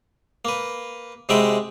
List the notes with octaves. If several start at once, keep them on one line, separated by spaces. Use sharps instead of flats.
A#3 B4
C3 G#3 F#4 E5 G5 B5